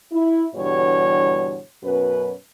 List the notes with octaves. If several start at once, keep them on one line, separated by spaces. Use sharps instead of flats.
E4
G2 B2 D3 E3 G3 C#5
F#2 B2 C#4 B4